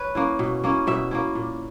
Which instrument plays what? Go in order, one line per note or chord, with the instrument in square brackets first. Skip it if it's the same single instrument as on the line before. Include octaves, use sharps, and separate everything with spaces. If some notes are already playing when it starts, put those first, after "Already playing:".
Already playing: [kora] B4 C#5
A#3 C#4 E4
B2
A#3 C#4 E4
B2 E5
A#3 C#4 E4
A#2